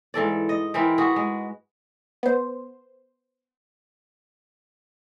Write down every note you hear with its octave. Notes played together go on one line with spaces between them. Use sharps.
G#2 E3 A4 D5
D#5
E3 C4 A#4 B4
F#4 G#4 B4
G#3
B3 C5